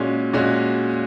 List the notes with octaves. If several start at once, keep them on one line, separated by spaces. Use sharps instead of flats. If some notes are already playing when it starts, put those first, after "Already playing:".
Already playing: A#2 G#3 C#4 F#4
A#2 G#3 C#4 F#4